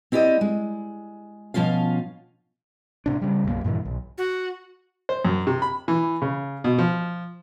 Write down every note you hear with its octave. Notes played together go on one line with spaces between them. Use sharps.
C4 E4 G4 D5 D#5
G#3
B2 F3 C#4 F4 F5
A2 C3 D4
C#3 G3
B1 F#2 F#3 A#3
G2 A#2 D#3 E3
B1
F#4
C5
F#2
C3
B5
E3
C#3
B2
F3